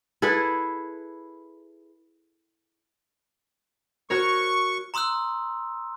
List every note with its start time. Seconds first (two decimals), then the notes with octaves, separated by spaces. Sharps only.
0.22 E4 G#4 A4 B4
4.10 F#4 A#4 C#5 C#6
4.94 A#5 C6 D#6 E6 F#6